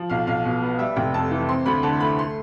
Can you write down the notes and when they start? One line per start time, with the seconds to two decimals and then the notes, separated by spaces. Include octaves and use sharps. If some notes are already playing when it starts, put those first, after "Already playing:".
Already playing: F3
0.10 B1 F5
0.27 B1 F5
0.45 B2
0.62 B3
0.79 G3 E5
0.96 F1 G5
1.14 F2 A5
1.31 E3
1.49 C4 C6
1.66 D2 B5
1.83 D3 A5
2.00 A3 B5
2.19 C6